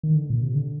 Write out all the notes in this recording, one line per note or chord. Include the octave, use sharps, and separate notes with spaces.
D#3
D3
A#2
C3
D3